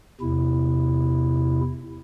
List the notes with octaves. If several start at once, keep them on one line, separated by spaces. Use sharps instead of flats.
E2 C3 E4